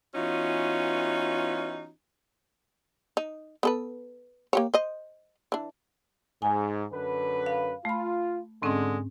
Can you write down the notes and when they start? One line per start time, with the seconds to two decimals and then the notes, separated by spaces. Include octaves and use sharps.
0.15 E3 B3 C#4 D#4 F4 F#4
3.17 D#4
3.63 B3 A4 B4
4.53 A#3 G4 C#5
4.74 C5 D#5
5.52 E3 D4
6.42 G#2 G#5
6.93 F#2 D3 B4
7.46 F5
7.85 A3 F4 B5
8.62 G#2 D3 G#3 C4 C#4